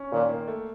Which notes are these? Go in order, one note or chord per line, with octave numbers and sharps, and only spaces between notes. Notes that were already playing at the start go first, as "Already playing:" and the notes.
Already playing: C#4
A#2 D#3
A#3
A3